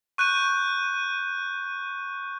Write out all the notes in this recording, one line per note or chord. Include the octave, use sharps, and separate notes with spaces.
C#6 F#6 G6 D#7